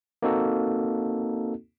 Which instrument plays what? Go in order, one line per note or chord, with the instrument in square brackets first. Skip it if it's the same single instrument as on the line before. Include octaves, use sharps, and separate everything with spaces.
[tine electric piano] A#3 C4 D#4 F#4 A4